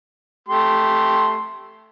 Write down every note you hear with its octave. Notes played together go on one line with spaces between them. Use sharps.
A3 G4 C6